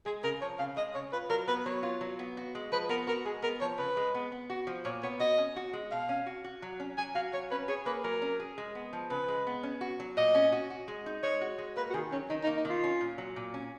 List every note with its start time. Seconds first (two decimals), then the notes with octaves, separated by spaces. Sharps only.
0.06 G#3 G#4
0.23 C#3 A#4
0.41 F3 C#5
0.59 C#3 F5
0.77 G#3 D#5
0.95 C#3 C#5
1.12 F4 B4
1.30 F#3 A#4
1.47 B3 B4
1.66 F#3 C#5
1.83 F4
2.01 F#3
2.19 B3
2.37 F#4
2.55 G#3
2.72 F3 B4
2.89 B3 A#4
3.07 F#4 A#4
3.25 G#3 G#4
3.42 B3 A#4
3.61 F3 C#5
3.78 C#3 B4
3.97 G#3
4.14 B3
4.32 B3
4.50 F#4
4.67 F3
4.85 A#2 C#5
5.03 B3 C#5
5.20 F#4 D#5
5.38 C#4
5.56 F#4
5.73 G#3
5.91 B2 F5
6.09 C#4
6.26 F#4
6.44 F#4
6.62 F#3
6.80 C#4
6.98 F#3 G#5
7.15 F#4 F5
7.33 F#3 C#5
7.51 C#4 B4
7.68 G#4 C#5
7.86 A#3 B4
8.04 F#3 A#4
8.22 C#4
8.40 G#4
8.58 G#3
8.75 B3
8.93 F3
9.10 C#3 B4
9.28 G#3
9.47 B3
9.63 C#4
9.81 F#4
10.00 F#3
10.17 A#2 D#5
10.35 C#4
10.52 F#4
10.70 F#4
10.88 G#3
11.06 D#4
11.23 G#3 C#5
11.41 F#4
11.58 G#3
11.77 A#3 B4
11.90 F#4
11.94 D#3 G#4
12.12 F#3 C#4
12.30 D#3 D#4
12.43 D#4
12.47 A#3
12.57 D#4
12.65 D#3 F4
12.83 C#4
13.01 A#2
13.18 F#3
13.36 A#2
13.54 C#4